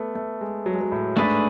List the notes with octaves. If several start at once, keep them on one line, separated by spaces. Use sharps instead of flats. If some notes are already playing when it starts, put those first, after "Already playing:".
Already playing: A3 B3
A3
G#3
F#3
G#3
F#3
A2
G#2 A3 D4 G#4 B4